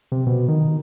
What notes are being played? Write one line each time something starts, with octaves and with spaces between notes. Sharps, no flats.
C3
B2
D#3